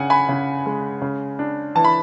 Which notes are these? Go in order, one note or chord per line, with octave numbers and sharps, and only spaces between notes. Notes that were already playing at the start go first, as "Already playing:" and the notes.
Already playing: C#3 D4 F#5 G#5
G#5 B5
C#3
G#3
C#3
D4
E3 A5
B5